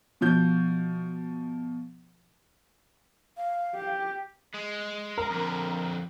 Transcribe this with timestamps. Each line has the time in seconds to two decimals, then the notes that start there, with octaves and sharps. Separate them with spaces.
0.21 B2 F3 G6
3.37 F5
3.75 G4
4.54 G#3
5.18 A#4
5.30 F2 D3